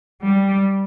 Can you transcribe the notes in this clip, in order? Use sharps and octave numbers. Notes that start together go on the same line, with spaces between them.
G3